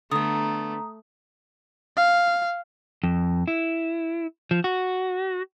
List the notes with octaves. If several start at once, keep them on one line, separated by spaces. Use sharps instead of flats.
D3 A3 B3 A#5 D#6
F5
F2
E4
F3
F#4